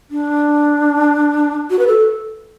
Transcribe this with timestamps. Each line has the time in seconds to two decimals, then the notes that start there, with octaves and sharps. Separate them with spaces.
0.11 D4
1.70 F#4
1.79 B4
1.87 A4